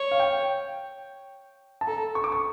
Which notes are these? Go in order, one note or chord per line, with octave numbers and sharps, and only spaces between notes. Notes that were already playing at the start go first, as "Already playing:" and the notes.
Already playing: C#5
F5
G5
A5
A4 A#5
C#6
D6
C#6